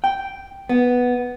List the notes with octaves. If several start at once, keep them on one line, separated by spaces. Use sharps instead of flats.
G5
B3